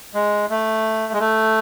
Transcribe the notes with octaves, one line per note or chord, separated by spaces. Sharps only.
G#3
A3
G#3
A3